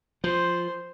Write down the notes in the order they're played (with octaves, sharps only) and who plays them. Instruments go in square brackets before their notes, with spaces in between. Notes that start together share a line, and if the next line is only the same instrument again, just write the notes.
[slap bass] F3 [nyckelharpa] C5